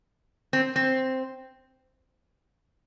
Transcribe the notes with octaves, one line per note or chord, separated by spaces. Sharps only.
C4
C4